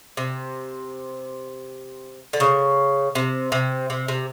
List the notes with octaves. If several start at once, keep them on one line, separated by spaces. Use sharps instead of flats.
C3
D3
C#3
C3
C3
C3
C3